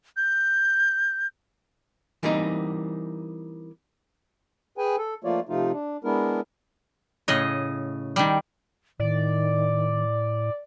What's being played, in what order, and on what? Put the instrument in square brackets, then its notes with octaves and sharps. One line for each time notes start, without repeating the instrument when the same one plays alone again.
[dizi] G6
[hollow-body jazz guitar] E3 G3 A#3 C4 D#4
[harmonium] G#4 B4 G5 G#5
A4
F3 A3 A#3 F4 C#5 D5
C3 F3 A3 D#4 F4
D4
G#3 B3 D4 E4 A#4
[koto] A2 C#3 D#5
D#3 G3
[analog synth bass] A2 [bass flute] D#3 [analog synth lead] D5